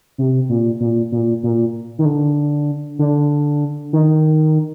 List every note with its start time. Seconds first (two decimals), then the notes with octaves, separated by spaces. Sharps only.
0.18 C3
0.49 A#2
0.80 A#2
1.12 A#2
1.43 A#2
1.99 D#3
2.06 D3
2.99 D3
3.93 D#3